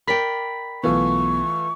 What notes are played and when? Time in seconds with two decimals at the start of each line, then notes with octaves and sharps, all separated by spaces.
0.08 A#4 D5 G5 B5 B6
0.84 B1 E3 A3 B3 F4 C#6